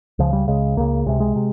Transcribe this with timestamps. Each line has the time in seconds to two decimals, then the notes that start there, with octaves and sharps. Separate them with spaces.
0.19 C#2 C#3 F3
0.33 G3
0.48 C#2 C#3 G#3
0.77 C#2 C#3 A#3
1.06 C#2 C3 G#3
1.20 G#3
1.36 C3